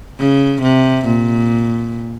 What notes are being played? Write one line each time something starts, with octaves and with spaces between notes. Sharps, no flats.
C#3
C3
A#2